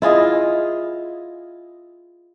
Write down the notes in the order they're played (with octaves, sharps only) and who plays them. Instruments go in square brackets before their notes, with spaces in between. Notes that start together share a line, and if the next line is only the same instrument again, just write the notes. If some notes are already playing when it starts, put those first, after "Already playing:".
[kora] E4 F4 G#4 D#5